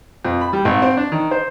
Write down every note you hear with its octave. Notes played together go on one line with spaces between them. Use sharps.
F2
B5
G3
G#1
C4
D4
D#3
C5